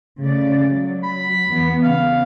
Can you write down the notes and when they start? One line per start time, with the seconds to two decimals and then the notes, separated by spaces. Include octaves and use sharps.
0.21 C#3 A3 D5
0.67 F#3
1.03 B5
1.48 E2 B3
1.83 C#3 B3 F5